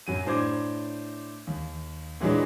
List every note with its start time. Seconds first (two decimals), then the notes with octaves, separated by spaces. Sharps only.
0.07 F#2 F#3 D#7
0.26 A2 D4 C5 D6 G#6
1.47 D#2
2.20 A#2 E3 F#3 G#3 D4 G#4